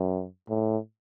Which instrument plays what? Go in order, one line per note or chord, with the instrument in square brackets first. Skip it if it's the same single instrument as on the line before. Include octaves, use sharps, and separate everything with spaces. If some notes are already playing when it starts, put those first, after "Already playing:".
Already playing: [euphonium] F#2
A2